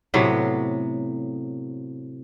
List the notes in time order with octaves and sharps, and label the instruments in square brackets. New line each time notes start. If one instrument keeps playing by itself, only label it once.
[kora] A2 C3 F#3 B3